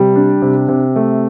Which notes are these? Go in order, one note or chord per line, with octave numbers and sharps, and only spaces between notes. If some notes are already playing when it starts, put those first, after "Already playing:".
Already playing: C3 G3
D4
C3
C3
A3